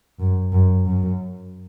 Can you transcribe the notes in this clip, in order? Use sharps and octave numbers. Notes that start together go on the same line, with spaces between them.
F#2
F#2
F#2